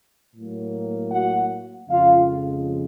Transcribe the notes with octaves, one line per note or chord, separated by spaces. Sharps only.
A2 F#3 A#3
F#4 F#5
F2 C#3 F3 G#3 F4 F5